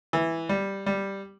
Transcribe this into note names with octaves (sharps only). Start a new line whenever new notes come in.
E3
G3
G3